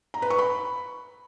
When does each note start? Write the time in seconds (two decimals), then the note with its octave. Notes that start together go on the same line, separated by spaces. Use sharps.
0.14 A#5
0.22 B4
0.30 C#6
0.39 B5